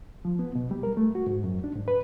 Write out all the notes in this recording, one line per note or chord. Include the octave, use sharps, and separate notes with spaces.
F3
B3
B2
G3
A#4
A3
F#4
G#2
F#2
D4
G#2
B4